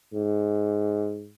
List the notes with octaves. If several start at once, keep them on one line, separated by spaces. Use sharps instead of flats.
G#2